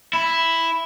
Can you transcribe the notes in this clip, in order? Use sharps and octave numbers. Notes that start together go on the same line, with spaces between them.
E4